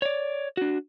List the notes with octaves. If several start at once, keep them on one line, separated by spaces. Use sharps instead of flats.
C#5 D5
D4 F#4